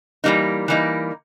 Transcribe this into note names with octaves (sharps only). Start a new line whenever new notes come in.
E3 G3 A#3 D#4
E3 G3 A#3 D#4